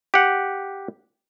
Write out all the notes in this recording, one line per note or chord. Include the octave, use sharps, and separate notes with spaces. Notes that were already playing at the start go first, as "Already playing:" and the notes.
G4 F#5